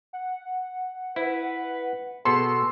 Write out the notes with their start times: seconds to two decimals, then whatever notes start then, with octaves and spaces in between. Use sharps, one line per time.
0.13 F#5
1.16 E4 B4
2.25 B2 B3 G#4 A4 C6 E6